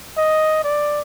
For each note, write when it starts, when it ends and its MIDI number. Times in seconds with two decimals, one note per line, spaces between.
0.17 0.63 75
0.64 1.01 74